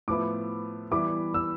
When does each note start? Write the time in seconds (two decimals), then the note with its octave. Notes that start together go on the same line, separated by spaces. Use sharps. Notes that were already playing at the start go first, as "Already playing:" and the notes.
0.08 A2 F3 B3 E4 D6
0.91 E3 G3 B3 E4 B4 D6
1.34 E6